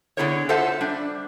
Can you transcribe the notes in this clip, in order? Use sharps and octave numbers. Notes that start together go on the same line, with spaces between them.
D3 B3 E4 G#4 A#4 C#5
F4 A4 C5 E5 F#5 A5
G3 D4